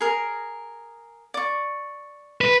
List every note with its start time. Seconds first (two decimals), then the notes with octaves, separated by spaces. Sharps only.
0.01 G#4 A#4
1.34 D5 C#6
2.41 B4